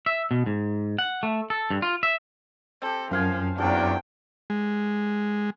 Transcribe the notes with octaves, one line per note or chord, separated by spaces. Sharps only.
E5
B2
G#2
F#5
A3
A4
G2
F4
E5
C4 G4 A4
F#2 F3 C5 F5 G#5
E2 F3 F#3 A#3 C4 D4 G5
G#3